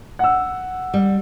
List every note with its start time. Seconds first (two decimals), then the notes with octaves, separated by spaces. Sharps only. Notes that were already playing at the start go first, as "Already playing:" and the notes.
0.19 F#5 E6
0.94 G3